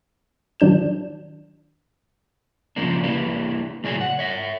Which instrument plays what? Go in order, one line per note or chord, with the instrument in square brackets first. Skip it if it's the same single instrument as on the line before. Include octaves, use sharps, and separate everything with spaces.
[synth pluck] D#3 F#3 D4 G6 E7
[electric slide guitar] C#3 F3 A#3 D4
A#3 D4 E4 G4 B4
A2 C#3 F#3 G#4 D5 G#5
F#5
C#5 E5